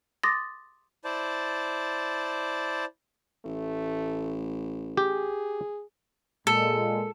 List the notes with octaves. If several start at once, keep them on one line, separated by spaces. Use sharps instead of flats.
C6 D6 D#6 A6 A#6
E4 C5 D5 A5
A1 A3
G4 G#4
A#2 G#3 A4